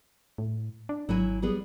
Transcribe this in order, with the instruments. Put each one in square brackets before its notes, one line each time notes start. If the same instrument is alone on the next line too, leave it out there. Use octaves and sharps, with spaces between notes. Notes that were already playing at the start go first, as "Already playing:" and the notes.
[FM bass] A2
D4
[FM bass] G#1 [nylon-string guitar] F#3 E4 G#5
[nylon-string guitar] G3 B3 G#4